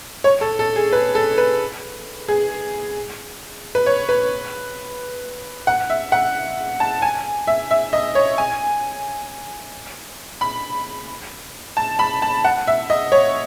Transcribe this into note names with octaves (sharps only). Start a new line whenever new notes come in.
C#5
A4
A4
G#4
B4
A4
B4
G#4
B4
C#5
B4
F#5
E5
F#5
A5
G#5
E5
E5
D#5
C#5
G#5
B5
A5
B5
A5
F#5
E5
D#5
C#5